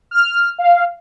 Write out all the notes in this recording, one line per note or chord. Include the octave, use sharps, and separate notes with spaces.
F6
F5